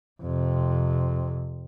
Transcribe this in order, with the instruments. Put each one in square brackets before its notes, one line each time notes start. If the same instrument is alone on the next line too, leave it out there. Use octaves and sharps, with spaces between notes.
[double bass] F2 C3